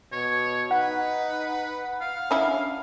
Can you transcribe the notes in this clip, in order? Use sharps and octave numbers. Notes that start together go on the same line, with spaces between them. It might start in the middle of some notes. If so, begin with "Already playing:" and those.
B2 C#5
D#4 B4 F#5
F5
C#4 D4 E4